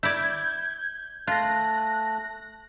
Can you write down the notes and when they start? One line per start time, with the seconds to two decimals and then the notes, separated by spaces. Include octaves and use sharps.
0.03 E4 D5 G6 G#6
1.27 A3 F4 F#6 A#6